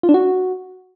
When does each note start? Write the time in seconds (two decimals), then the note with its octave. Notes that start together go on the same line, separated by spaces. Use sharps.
0.03 F4
0.09 D4
0.14 F#4